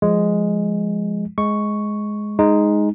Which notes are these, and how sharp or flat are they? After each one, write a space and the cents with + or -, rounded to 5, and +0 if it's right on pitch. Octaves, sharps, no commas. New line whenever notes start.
F3 +0 G#3 +0
G#3 +10 C#6 +0
G#3 +0 D#4 +0